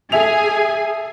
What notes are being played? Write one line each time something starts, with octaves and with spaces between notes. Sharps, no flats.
G#4 A4 E5 G#5 F7